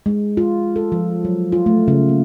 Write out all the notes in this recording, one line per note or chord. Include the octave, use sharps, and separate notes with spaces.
G#3
F4
A4
F3
F#3
F4
A3
C#3
A#3